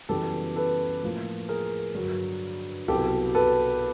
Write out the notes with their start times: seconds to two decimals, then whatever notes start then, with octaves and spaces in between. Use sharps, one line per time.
0.09 F#2 C#3 E3 G3 B3 G4 A4
0.56 A4 B4
1.03 A2 F3 A#3
1.48 G#4 A#4
1.95 G2 D3 F#3
2.88 C2 B2 F#3 G4 A4
3.35 A4 B4